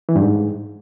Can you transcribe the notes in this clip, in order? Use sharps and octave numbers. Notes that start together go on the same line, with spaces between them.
E3
G2
G#2